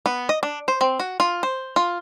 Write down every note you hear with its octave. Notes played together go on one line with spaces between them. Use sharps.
B3
D#5
D4
C5
C4
F#4
F4
C5
F4